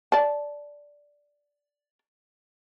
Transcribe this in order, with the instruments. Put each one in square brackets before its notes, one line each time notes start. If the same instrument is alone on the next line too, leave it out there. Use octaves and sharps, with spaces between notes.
[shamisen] D5 A5